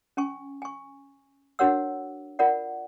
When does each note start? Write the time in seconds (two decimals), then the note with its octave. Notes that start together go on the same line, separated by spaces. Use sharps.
0.17 C#4 G#5 C#6
0.62 G#5 C#6
1.59 D4 F#4 A#4 C#5 F#5 E6
2.39 F4 A#4 D5 F#5